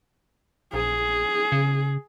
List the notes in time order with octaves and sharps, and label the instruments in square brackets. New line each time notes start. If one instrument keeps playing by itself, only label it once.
[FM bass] A#1 [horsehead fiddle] G#4
[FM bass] C#3